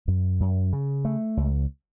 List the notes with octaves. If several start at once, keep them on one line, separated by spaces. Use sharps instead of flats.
F#2
F#2
C#3
A3
C#2